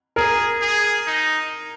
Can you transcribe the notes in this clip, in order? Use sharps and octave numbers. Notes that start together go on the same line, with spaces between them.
G#4 A#4
G#4
D#4